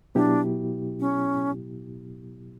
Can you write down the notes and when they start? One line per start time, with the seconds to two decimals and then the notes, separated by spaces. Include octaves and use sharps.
0.15 B2 F#3 B3 D4 E4 G4
1.00 C#4